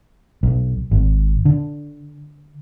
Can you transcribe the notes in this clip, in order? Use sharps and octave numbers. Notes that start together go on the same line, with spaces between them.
B1
G#1
D3